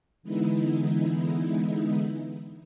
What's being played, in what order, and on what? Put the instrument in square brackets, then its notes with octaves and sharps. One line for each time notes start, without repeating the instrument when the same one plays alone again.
[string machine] D3 E3 G#3 B3 D#4 E4